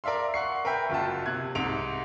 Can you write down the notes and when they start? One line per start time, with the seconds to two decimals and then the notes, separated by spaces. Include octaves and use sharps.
0.04 A#4 D5 E5 F5 C6
0.34 F#5 C#6 C7
0.65 A#4 B4 E5 G5
0.90 F#1 F4 F#4 A5
1.26 C3 F#6 G#6
1.55 C2 G#2 D7 F7